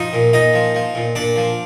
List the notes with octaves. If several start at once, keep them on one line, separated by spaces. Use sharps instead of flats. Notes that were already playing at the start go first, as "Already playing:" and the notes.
Already playing: F3 D#4 D#5
A#2
A#2 D#4 D#5
F3
F3
A#2
A#2 D4 D5
F3